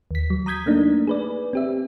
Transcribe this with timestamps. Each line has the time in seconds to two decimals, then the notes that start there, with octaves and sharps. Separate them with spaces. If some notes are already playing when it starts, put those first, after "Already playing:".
0.11 D#2 B6
0.30 F#3
0.46 A#5 D#6 G6 G#6 B6
0.66 A3 A#3 D4 D#4
1.07 G#4 B4 D5
1.53 C4 G4 E5